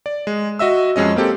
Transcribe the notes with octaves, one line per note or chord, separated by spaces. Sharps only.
D5
G#3
F#4 D#5 E5 E6
F2 G#3 C#4 D#5
A#3 C4 G4 A4